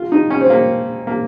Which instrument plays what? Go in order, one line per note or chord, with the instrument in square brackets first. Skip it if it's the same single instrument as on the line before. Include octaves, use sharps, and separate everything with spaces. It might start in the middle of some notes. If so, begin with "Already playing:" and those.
Already playing: [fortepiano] F4
D#4
C#4
C4
A#3
A#3